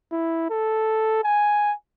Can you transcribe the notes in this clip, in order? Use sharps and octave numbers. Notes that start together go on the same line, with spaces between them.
E4
A4
G#5